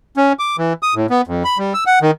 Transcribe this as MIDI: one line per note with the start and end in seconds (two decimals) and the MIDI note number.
0.17 0.33 61
0.39 0.56 86
0.58 0.73 52
0.83 0.94 87
0.95 1.06 45
1.10 1.22 59
1.27 1.43 41
1.44 1.58 83
1.58 1.73 55
1.74 1.84 88
1.86 1.99 78
2.02 2.11 51